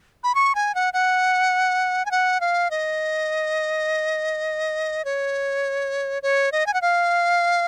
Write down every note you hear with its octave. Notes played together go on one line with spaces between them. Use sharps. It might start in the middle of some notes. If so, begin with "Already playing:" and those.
B5
C#6
G#5
F#5
F#5
G#5
F#5
F5
D#5
C#5
C#5
D#5
G#5
F#5
F5